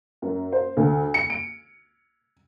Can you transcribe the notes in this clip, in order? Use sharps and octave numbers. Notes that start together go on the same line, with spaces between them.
F#2
C5
D2
C#7
D7